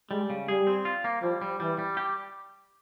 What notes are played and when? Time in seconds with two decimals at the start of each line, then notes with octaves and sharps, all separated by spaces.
0.11 G3 G#3
0.30 C#3
0.48 G3 G#4
0.67 C4
0.85 F4
1.04 A#3
1.22 F3 G3
1.42 G3
1.60 E3 G3
1.79 G3
1.97 G4